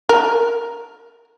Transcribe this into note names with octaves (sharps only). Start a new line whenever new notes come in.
A#4